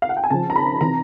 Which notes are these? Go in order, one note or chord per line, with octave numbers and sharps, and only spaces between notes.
F5
F#5
G5
G#5
C#3 F3 A5
A#5
B5
C3 E3 A#5